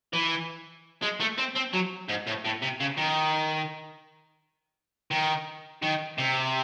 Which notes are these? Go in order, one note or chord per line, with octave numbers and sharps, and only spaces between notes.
E3
G#3
A3
C4
C4
F#3
G#2
A2
A2
C3
C#3
D#3
D#3
D#3
C3